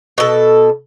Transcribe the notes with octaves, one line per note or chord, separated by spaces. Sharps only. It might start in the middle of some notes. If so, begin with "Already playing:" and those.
B2 A4